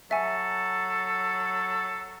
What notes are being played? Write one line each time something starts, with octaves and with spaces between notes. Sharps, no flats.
F#3 A4 E5 G#5